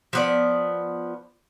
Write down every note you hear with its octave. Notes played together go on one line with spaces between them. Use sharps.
F3 B3 D5